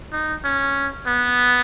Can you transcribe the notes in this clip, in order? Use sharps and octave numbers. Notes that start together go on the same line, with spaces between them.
D#4
C#4
B3